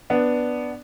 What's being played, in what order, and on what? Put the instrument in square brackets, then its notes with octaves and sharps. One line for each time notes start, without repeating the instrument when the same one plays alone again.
[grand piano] B3 D4